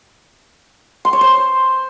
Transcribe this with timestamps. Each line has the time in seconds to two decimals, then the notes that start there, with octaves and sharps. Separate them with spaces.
1.05 C6
1.13 C#5
1.21 C5